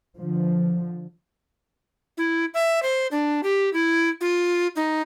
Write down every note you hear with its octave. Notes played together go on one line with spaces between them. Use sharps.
D3 F3
E4
E5
C5
D4
G4
E4
F4
D#4